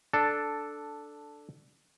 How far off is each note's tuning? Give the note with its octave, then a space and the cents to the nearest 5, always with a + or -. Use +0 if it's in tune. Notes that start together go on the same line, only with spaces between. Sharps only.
D4 +0 A4 +0